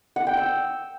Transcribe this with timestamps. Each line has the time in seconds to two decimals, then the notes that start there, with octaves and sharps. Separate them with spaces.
0.16 F#5
0.27 G5
0.37 E6